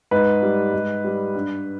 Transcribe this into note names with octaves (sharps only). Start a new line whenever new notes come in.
G#2 B4
G3
G#2
G3
G2